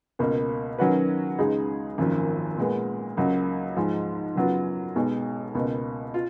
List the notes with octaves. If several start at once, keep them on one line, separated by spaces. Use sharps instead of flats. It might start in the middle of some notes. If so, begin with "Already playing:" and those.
C#2 B2 A#3
D#3 F#3 C#4 F#4 B4
C#2 C#3 G#3 D#4 G#4
G#1 F#2 F3 A#3
A#2 G#3 B3
C#2 C#3 F#3 A#3
G#2 F3 G#3
F#2 C#3 F#3 B3 F4
B1 B2 G#3
C#2 B2 A#3
F4